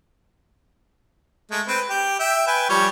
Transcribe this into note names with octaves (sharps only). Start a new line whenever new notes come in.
G#3 A3
C4 B4 G5
G4 G5
E5 G5
B4 G5 G#5
F3 G3 C#5